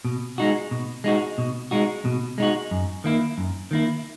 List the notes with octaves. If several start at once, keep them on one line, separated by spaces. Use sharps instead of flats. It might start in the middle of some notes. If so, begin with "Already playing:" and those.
B2
G#3 D#4 F#4
B2
G#3 D#4 F#4
B2
G#3 D#4 F#4
B2
G#3 D#4 F#4
F#2
D#3 A#3 E4
F#2
D#3 A#3 E4